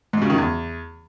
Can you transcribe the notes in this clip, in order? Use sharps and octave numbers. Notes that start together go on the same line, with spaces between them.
G#2
C#3
D#3
E2